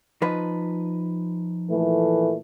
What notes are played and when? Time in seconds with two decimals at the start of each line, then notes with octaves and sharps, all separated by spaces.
0.22 F3 D#4 B4
1.70 A#2 E3 A3